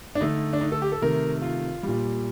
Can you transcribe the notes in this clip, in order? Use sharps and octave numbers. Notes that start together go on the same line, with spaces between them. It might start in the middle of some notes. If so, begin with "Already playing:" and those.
D4
D3 A3 D#4
D4
D#4
A4
G4
A4
C3 D#3 A3 A#4
F4
A#2 G3